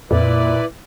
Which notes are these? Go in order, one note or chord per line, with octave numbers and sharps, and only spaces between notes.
F2 A#2 E4 B4 D5